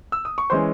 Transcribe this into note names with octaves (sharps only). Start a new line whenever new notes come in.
E6
D#6
C#6
E3 G#3 C#4 C5 C6